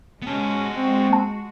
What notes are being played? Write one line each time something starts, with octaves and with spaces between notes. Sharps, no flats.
G#3 B3 C#4 F#4 A5
C4
A5